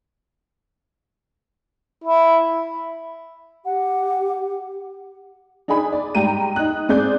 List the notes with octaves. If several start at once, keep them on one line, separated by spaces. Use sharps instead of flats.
E4
G4 F#5
D4 D#4 G#4 G#5 B5
D5
G#2 G3 G5 A#5 D#7
D#4 F#6
G#2 C4 G#4 D5 G6